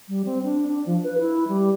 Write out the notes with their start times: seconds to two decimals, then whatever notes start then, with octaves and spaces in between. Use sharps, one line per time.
0.09 G3
0.25 C4
0.44 D4
0.67 D4
0.86 F3
1.03 B4
1.19 E4
1.48 G3